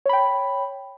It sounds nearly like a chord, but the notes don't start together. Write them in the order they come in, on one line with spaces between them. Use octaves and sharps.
C#5 B5 G5